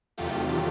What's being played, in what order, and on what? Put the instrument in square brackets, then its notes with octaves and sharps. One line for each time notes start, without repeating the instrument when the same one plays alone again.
[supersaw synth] E2 C3 D#3 F#3 A3 F4 G4